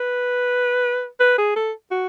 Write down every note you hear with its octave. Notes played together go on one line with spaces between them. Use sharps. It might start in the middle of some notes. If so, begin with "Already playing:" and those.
Already playing: B4
B4
G#4
A4
F#4